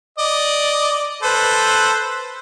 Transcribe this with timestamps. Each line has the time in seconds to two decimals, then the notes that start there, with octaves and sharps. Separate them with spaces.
0.18 D5 D#5
1.23 A4 B4 C5